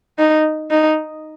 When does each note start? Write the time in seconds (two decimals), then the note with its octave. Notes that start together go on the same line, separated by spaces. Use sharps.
0.18 D#4
0.71 D#4